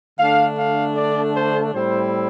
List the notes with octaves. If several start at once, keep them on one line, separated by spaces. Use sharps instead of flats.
D3 A3 D4 F5
F5
D5
C5
A2 G3 C4 E4 C5